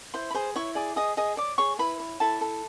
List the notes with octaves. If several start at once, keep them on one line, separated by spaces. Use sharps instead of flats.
E4 C5 C6
B5
G#4 C5 C6
E4 C#5 C#6
G#4 D5 D6
G#4 D#5 D#6
G#4 D#5 D#6
C#5 D5 D6
G#4 C#5 C#6
E4 B4 B5
C#5
E4 A4 A5
A4